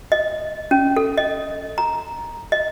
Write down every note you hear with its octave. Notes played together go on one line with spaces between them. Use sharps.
D#5
C#4
A4
D#5
A#5
D#5